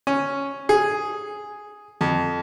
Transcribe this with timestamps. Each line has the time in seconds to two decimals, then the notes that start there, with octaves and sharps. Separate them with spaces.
0.07 C#4
0.69 G#4
2.01 F2